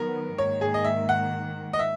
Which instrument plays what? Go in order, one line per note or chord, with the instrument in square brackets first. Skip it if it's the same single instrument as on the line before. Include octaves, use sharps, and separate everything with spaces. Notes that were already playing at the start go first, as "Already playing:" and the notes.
Already playing: [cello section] D#3 F#3 B3 [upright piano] A#4
[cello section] G#2 D#3 A#3 [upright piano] C#5
[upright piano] G#4
D#5
E5
F#5
D#5
E5